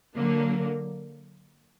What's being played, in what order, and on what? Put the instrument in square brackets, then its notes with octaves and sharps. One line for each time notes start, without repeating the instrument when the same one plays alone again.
[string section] D3 F#3 A#3